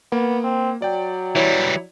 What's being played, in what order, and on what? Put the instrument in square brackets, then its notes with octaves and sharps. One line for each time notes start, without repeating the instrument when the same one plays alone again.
[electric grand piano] A#3 [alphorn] B3
[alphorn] C4
[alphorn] F#3 [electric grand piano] D5 G5
[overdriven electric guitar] E3 G3 [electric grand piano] E4 C#5 D5